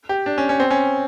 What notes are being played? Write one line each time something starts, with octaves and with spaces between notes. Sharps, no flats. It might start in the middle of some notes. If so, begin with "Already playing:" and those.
G4
D4
C#4
C#4
C4
C#4